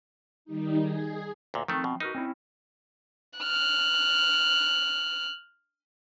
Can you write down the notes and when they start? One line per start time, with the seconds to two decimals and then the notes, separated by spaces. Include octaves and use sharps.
0.45 D#3 G3 D#4
0.79 G#4
1.54 D2 A#2
1.68 D#3 F3 A3 C4
1.84 B2
2.00 D#4 F#4 A#4 B4
2.15 C4 C#4 E4
3.39 F6 F#6